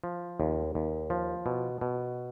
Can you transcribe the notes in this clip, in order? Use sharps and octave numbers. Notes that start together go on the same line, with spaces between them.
F3
D#2
D#2
F3
B2
B2